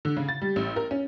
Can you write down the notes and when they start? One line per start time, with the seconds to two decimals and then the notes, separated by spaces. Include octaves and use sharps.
0.05 D3
0.17 C#3
0.29 A6
0.42 G3
0.56 A1
0.76 A#4
0.91 C#4